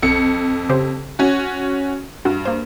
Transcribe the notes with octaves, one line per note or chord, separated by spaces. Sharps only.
B1 F2 C#7
C#3 G4 C5
C#4 F#4
G2 F#4
A#3 C5